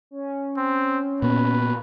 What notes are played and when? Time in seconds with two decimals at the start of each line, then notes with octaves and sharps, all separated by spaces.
0.11 C#4
0.58 C4
1.22 A#2 B3 B4